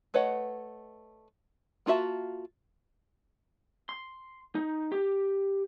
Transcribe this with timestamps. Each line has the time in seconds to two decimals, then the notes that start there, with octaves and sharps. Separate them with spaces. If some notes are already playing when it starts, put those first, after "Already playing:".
0.14 A3 B4 C#5 D#5 F#5
1.86 A#3 F4 F#4 E5 A5
3.89 C6
4.55 D#4
4.92 G4